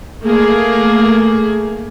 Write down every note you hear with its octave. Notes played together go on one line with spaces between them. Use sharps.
A3 A#3 G#4